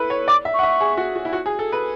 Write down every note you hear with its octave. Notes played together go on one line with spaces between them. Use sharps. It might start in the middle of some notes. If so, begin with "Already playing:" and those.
Already playing: E4 A4 B4
C#5
D5 D6
E5
F#5 C#6
E5
G#4
F#4
F#4
E4
F#4
G#4
A4
B4